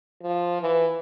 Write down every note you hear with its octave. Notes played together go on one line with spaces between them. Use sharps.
F3
E3